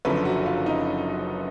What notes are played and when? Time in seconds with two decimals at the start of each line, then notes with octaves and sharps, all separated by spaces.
0.05 F#1 F#2 D3 F3 B4
0.25 F#4
0.46 F4
0.66 D#4